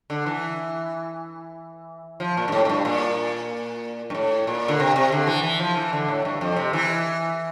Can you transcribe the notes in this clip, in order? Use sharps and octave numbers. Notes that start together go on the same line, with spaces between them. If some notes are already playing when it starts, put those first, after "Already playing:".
D3
E3
F3
A#2
G2
A2
A2
G2
A#2
G2
A2
A#2
D3
C3
C3
D3
E3
E3
F3
E3
D3
A2
G2
F2
C3
E3